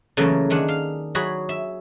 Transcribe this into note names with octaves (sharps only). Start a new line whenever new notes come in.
C#3 E3 F#3 A3 A#3
D#3 D4 G#4 F#5
F5
F#3 F#4 G#4 B5
E5